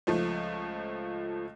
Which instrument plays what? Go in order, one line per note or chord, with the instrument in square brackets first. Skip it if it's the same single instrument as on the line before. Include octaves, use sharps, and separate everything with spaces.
[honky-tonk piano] C#2 F3 A3